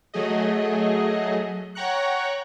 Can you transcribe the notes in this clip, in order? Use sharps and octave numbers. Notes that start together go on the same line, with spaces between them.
F#3 A3 G#4 D#5
C#5 F#5 G5 A#5 C#6 F#6